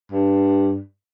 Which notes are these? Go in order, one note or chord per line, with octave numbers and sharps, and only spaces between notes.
G2